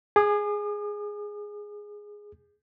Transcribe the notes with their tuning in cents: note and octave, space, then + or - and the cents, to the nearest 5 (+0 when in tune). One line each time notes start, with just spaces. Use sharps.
G#4 +0 D#6 -45